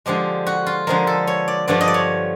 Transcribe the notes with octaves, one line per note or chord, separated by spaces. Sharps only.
D3 F3 G#3 G4
F#4
F4
D3 F3 G#3 A#4
A4
C#5
D5
G2 D3 F3 A3 D5
D#5
D5
C#5